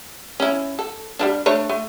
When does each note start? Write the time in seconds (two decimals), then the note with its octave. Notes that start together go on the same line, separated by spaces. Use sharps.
0.40 C#4 E4
0.79 A4
1.19 G3 A#3 D4
1.46 A3 D4 C#5
1.70 A3